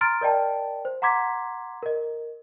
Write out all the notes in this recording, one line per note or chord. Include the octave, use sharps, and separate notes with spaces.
A#5 C6 F6 A6 D7
A#4 D5 D#5 G5 A5
C5
F#5 A#5 C6 D6 G#6 B6
A#4 D#5